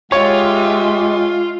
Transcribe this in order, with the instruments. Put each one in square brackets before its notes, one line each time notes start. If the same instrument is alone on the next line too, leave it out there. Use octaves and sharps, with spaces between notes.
[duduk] G#3 [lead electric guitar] F4 [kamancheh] G4 E5 [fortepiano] C#5